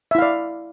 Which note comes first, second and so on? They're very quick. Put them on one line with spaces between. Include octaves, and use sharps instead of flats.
E5 E4 F5 D5